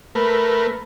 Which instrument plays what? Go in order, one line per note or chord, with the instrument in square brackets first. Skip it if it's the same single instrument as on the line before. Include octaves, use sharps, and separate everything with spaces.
[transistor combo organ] A3 A#4 B4